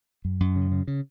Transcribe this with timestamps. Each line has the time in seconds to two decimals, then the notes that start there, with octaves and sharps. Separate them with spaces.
0.25 F#2
0.40 F#2
0.56 C#3
0.72 C#3
0.88 C#3